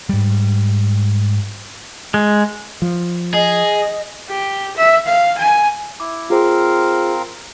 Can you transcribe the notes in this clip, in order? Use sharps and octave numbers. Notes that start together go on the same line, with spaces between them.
G#2 G3
G#3
F3
G#4 D#5
G4
E5
F5
G#5
E4 D6
C4 F4 G#4 A#4 C5 F5